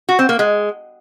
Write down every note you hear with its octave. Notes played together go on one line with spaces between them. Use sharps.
F#4
C4
A#3
G#3